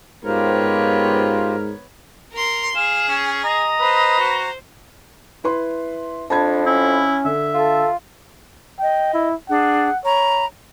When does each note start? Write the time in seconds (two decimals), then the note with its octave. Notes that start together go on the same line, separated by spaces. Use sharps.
0.25 G#2 B3 F4 G4 A#4 C5 C#5
2.33 A#4 C6
2.75 G#4 F5 E7
3.08 C#4
3.44 D#5 A#5
3.81 B4 C5
4.19 F#4
5.44 E4 B4 C6
6.30 F2 D4 A5 B5 G#6
6.66 C#4 E4
7.25 D3 E5
7.54 F4 A4
8.79 D#5 G5
9.14 E4
9.49 D4 G#4 F#5
10.04 C#5 A#5 B5